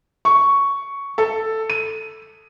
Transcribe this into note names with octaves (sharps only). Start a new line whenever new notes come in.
C#6
A4
D#7